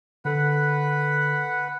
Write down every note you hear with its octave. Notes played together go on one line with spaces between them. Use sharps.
D3 A4 B4 F#5